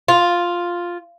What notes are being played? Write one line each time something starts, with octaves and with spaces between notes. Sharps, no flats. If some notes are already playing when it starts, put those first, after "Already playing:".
F4